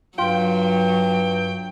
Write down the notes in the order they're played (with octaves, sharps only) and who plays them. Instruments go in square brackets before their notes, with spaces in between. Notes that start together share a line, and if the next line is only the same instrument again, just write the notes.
[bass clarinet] G2 [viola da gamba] F#3 [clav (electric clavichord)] F4 [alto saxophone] G5